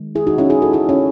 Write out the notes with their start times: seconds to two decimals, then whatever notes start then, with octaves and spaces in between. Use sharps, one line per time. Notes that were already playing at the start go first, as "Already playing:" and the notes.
Already playing: D#3 G#3
0.15 E4 G#4
0.27 D#4 F#4
0.38 C#4 E4
0.50 E4 G#4
0.62 F#4 A4
0.73 E4 G#4
0.89 C#4